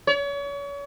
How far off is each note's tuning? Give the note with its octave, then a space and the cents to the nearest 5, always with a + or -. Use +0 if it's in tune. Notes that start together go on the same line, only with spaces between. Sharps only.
C#5 +35